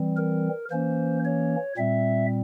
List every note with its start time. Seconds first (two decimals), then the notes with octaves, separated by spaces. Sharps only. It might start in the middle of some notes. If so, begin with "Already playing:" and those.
Already playing: E3 G3 C4
0.17 A#4
0.70 E3 A#3 C#4 C5
1.24 C#5
1.78 A#2 G3 C4 E5